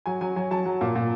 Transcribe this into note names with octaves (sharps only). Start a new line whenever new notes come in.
F#3 G#5
F#3 G#5
F#3 G#5
F#3 A5
F#3
A#2
A#2